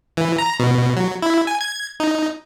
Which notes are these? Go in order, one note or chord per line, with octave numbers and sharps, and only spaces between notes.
E3
A#5
B2
F#3
E4
G#5
G#6
D#4